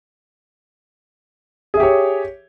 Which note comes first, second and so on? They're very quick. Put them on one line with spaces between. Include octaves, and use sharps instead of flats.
G#4 E5 G4 C#5